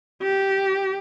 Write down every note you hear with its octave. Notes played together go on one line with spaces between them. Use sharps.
G4